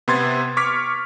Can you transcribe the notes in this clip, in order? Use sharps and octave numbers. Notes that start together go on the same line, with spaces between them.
C3 B3 C6 G#6 A6
C#6 D6 F6 B6